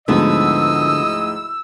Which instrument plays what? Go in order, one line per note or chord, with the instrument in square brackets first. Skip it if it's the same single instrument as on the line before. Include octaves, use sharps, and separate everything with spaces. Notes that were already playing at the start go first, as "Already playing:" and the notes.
[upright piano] D2 G#2 F3 [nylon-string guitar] D3 B3 [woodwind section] E4 E6 [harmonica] D#5